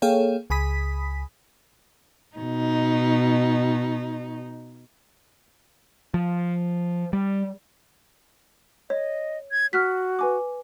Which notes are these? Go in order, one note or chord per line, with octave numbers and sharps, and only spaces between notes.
A#3 G#4 A4 C#5 F5 G5
C#2 G#5 B5 D#6 B6
B2 D#4
F3
G3
C#5 D#5
G#6
F#4 F6 F#6 B6
B4 G#5 D6